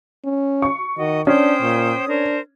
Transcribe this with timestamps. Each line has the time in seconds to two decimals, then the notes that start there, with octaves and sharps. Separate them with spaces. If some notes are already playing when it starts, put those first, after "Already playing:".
0.24 C#4
0.62 C#6
0.98 D#3 F#4 D#5
1.27 C#4 D4 C5 G5 D#6
1.62 A#2
2.08 D4 A#4 C5